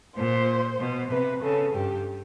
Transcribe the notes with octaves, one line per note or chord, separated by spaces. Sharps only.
A#2 C5
B2
C3 B4
C#3 A4
G2 G4